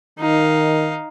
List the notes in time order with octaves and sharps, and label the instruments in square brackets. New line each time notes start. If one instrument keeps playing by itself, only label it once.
[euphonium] D#3 [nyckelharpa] D#4 F5